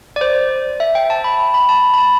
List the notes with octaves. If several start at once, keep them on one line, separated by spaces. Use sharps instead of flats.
D5
C5
E5
G5
A5
B5
B5
A5
B5
A5